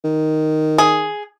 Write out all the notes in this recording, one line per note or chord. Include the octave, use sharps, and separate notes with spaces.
D#3
G#4